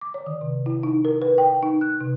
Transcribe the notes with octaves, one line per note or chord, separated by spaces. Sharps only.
D6
C#5
D#3
C3
E4
D#4
A#4
B4
G5
D#4
F#6
C3